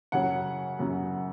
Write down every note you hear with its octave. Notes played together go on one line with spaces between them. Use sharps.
F#2 C#3 F#3 F#5
F#2 C#3 F#3